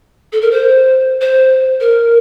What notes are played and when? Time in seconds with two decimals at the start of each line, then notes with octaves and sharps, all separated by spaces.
0.32 A4
0.42 A#4
0.51 C5
1.21 C5
1.80 A#4